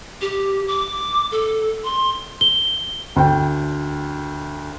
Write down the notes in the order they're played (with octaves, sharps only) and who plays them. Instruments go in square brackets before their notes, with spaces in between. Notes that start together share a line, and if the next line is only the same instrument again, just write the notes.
[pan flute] G4
D6
A4
C6
[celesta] G7
[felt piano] D2 G5